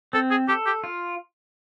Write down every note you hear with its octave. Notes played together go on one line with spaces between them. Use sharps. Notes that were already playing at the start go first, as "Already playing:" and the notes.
C4 A4
G#4
G4 A4
G4
F4